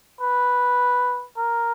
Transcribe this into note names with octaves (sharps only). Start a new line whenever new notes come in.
B4
A#4